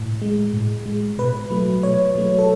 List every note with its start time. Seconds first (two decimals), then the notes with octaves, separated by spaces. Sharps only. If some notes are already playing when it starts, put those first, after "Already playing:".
Already playing: A2
0.22 G#3
0.53 A2
0.86 G#3
1.18 B2 B4
1.51 F#3 A3
1.83 B2 C#5
2.16 F#3 A3
2.39 A4